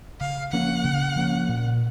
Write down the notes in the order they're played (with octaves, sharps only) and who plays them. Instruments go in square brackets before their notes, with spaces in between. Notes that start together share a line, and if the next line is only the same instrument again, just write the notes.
[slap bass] C#3 [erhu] F5
[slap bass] F3 A#3 C#4 [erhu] F#5
[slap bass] C#3
F3 A#3 C#4
A#2